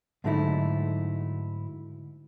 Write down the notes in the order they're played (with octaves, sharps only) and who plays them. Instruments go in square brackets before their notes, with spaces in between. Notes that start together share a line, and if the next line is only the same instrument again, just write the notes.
[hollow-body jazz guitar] G#2 D3 F#3 A3 D#4 E4